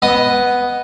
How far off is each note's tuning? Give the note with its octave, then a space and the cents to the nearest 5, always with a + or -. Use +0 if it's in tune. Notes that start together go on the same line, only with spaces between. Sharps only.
B3 +0 D#5 +0